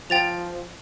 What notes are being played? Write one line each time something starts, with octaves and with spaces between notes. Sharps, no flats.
F3 G5 A6 F7